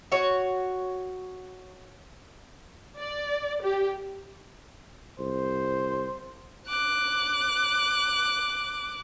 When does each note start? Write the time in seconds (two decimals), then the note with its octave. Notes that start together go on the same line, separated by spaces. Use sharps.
0.12 F#4 C#5
2.97 D5
3.61 G4
5.20 C2 C5
6.68 D6 F#6